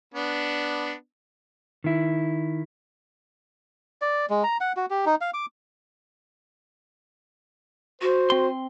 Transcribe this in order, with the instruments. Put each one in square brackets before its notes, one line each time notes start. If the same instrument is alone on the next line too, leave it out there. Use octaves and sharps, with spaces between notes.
[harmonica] B3 D4
[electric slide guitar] D#3 E4
[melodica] D5
G#3
A#5
F#5
F#4
G4
D#4
F5
D6
[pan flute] F#4 [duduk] C5
[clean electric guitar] C4 C6